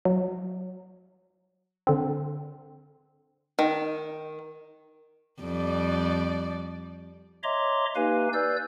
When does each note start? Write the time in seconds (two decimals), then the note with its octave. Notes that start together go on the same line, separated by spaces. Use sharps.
0.05 F#3
1.87 D3 C4
3.59 D#3
5.41 F2 G3 D5
7.43 C#5 D#5 E5 A#5 C6 D6
7.96 A#3 D#4 G4 B4 F5 G#5
8.33 B4 D5 E6 G6